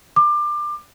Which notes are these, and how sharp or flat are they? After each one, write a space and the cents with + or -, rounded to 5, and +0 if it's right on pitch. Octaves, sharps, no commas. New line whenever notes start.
D6 +25